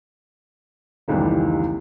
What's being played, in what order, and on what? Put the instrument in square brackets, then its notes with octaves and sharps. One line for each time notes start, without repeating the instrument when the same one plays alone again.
[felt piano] F1 C#2 D#3 E3 G3 B3